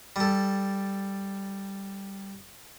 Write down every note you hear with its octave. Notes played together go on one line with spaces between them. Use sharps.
G3 A4